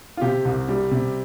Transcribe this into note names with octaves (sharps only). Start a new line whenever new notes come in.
F4
C3 G4
C2
G3
C3